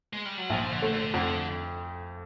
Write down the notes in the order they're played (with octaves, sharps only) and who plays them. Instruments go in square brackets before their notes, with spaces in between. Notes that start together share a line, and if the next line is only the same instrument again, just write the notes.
[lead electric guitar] G#3
G3
F#3
[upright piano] A#1 [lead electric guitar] F3
[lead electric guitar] D3
[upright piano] A3
[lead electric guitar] D3
[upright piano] F2 [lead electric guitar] D3